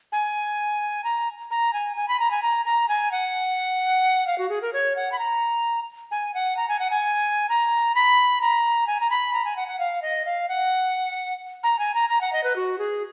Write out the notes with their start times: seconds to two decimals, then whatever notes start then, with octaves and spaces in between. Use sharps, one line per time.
0.12 G#5
1.04 A#5
1.51 A#5
1.73 G#5
1.97 G#5
2.08 B5
2.20 A#5
2.31 G#5
2.42 A#5
2.65 A#5
2.89 G#5
3.12 F#5
4.27 F5
4.38 F#4
4.49 G#4
4.62 A#4
4.73 C#5
4.96 F#5
5.12 B5
5.19 A#5
6.11 G#5
6.34 F#5
6.57 A#5
6.69 G#5
6.79 F#5
6.90 G#5
7.49 A#5
7.95 B5
8.41 A#5
8.87 G#5
9.00 A#5
9.10 B5
9.33 A#5
9.45 G#5
9.57 F#5
9.68 F#5
9.79 F5
10.02 D#5
10.26 F5
10.49 F#5
11.63 A#5
11.79 G#5
11.94 A#5
12.09 A#5
12.21 F#5
12.33 D#5
12.44 B4
12.56 F#4
12.79 G#4